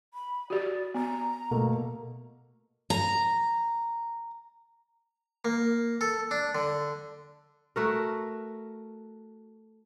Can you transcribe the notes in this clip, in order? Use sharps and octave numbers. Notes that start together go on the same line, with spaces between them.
B5
F#4 G4 D5
B3 A#5
B2 A3 A#3
A#5
A#3
A4
D4
D3
A3 F#4 A#4